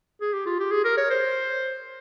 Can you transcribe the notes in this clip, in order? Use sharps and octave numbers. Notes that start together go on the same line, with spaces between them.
G#4
G4
F4
G4
G#4
A#4
C#5
C5